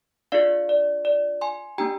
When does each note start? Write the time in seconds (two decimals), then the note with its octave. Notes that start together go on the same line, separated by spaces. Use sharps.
0.32 D4 F4 G#4 D5 F5
0.69 D5
1.05 D5
1.41 G#5 C6
1.78 A#3 D4 G4 G5 A#5